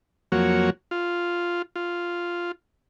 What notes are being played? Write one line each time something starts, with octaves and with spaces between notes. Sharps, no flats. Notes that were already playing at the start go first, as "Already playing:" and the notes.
F2 F#3 A#3 F#4 C#5
F4
F4